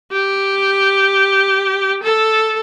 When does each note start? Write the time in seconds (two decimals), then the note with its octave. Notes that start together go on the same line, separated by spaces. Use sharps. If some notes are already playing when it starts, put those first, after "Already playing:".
0.12 G4
2.03 A4